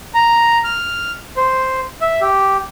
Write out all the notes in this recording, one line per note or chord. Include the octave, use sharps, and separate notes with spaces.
A#5
F6
C5
E5
G4